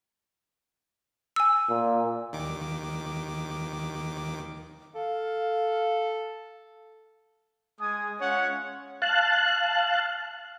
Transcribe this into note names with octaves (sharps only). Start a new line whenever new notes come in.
G#5 E6
A#2
D#2 D#3 D6
A4 F5
G#3 G#5 D#6
G#3 C#4 F4 C#5 F#5
F5 A5 F#6